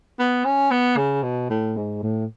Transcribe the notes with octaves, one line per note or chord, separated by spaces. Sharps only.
B3
C#4
B3
C#3
B2
A2
G#2
A2